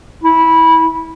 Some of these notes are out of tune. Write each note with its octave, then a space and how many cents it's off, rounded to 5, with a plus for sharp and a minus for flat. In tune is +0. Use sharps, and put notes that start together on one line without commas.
E4 -15